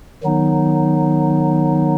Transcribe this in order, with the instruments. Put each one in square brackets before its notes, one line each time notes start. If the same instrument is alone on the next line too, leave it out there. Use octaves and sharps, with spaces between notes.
[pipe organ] D#3 F#3 B3 D#4